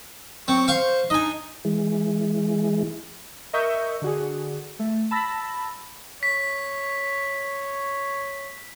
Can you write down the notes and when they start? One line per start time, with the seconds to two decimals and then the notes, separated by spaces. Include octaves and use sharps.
0.48 F#3 C4 G5 C#6
0.68 C5 F5 C#6
1.10 D4 D#4 D#5 G#5
1.65 E3 G#3
3.53 A#4 D#5 E5 C#6 E6 G6
4.02 D3 F#4 G#4
4.79 A3
5.11 A5 B5 E6 A#6
6.23 C#5 B6